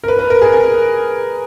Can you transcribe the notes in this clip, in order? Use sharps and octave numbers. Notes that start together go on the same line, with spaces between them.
A#4
B4
B4
A#4
G#4
A#4